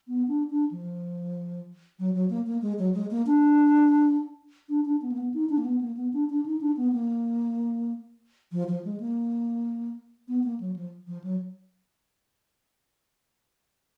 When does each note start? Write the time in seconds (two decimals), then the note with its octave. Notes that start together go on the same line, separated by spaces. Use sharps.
0.08 B3
0.28 D4
0.50 D4
0.71 F3
1.99 F#3
2.15 F#3
2.30 A#3
2.46 A#3
2.62 G#3
2.79 F#3
2.94 G#3
3.11 A#3
3.26 D4
4.69 D4
4.85 D4
5.02 B3
5.12 A#3
5.18 B3
5.34 D#4
5.49 D4
5.58 A#3
5.65 B3
5.81 A#3
5.97 B3
6.13 D4
6.30 D4
6.46 D#4
6.61 D4
6.77 B3
6.92 A#3
8.52 F3
8.68 F3
8.85 G#3
9.00 A#3
10.28 B3
10.44 A#3
10.60 F#3
10.76 F3
11.07 F3
11.24 F#3